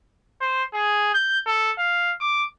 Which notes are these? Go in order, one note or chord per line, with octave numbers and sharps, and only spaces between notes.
C5
G#4
G6
A4
F5
D6